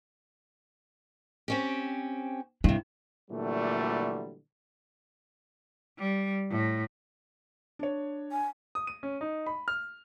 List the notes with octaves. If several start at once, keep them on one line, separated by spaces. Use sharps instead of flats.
C4 C#4 G4
G2 C3 E4
A#2 D3 E3 F#3 G3 A3
G3
A2
D4 C#5
G#5
D#6
D#7
C#4
D#4
B5
F6